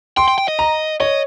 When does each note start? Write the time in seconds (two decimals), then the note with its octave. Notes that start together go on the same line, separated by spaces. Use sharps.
0.17 G5 C6
0.28 G5
0.38 G5
0.48 D#5
0.59 A#5
1.00 C#5 D#5